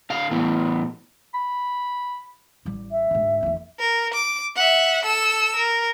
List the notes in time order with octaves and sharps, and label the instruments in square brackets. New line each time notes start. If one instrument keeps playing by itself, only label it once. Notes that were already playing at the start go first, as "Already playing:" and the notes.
[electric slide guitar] D3 F5
A2 E3 B3
[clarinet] B5
[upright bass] A1 G3
[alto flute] E5
[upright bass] D2 G#2
F#1 E2
[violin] A#4
D6
E5 F#5
A4 E6
A#4